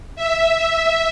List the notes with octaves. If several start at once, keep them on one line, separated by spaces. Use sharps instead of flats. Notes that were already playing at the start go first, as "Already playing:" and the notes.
E5